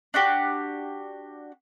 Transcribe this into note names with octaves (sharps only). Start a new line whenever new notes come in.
D4 F#4 G4